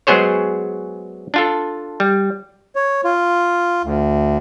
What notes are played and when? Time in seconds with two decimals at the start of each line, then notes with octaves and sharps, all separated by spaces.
0.07 F#3 G#3 B3 G#4 C5 C#5
1.34 D4 F4 A4
2.00 G3
2.75 C#5
3.04 F4
3.84 D2